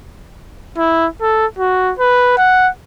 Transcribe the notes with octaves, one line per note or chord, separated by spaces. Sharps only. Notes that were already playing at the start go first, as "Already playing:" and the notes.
E4
A4
F#4
B4
F#5